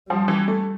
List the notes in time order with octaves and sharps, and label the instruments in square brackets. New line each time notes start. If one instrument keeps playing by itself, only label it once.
[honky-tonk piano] F3 [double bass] G3
[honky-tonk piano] E3
A3